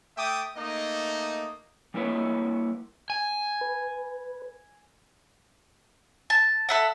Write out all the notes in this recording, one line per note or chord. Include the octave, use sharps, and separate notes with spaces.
A3 E5 G5 D6 D#6
A3 A#3 D#4 D#5
G3 A#3 E4 B4 C#5
G#5
B4
A5
A4 E5 F#5